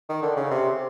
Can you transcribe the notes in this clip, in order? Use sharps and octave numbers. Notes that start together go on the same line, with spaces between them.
D#3
D3
C#3
C3